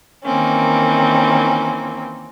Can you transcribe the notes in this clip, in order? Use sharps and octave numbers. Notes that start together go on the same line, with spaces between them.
D#3 E3 A#3 C4 C#4